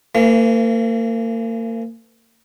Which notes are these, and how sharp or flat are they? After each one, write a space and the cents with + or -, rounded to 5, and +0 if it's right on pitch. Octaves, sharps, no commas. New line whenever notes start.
E3 +40 A#3 -40